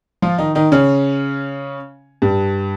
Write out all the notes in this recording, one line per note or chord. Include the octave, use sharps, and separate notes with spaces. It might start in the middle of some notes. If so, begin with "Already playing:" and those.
F3 F4
D#3 D#4
D#3 D#4
C#3 C#4
G2 G3